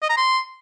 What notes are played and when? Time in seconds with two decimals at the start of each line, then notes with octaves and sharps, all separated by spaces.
0.03 D#5
0.10 A#5
0.17 C6